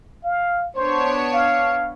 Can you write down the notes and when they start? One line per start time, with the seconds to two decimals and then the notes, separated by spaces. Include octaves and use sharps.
0.24 F5
0.76 B3 D4 C5 C#5
1.33 F5